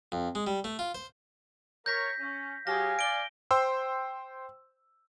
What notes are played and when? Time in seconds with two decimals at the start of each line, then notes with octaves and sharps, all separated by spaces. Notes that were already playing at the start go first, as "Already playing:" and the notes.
0.12 F2
0.35 G#3
0.47 G3
0.64 A3
0.79 F4
0.95 C5
1.86 A#4 C#5 G6 A#6 B6
2.20 C#4
2.67 F#3 G4 G#4 F5 G#5 A#6
2.99 D5 D7 G7
3.51 C5 G5 C6 E6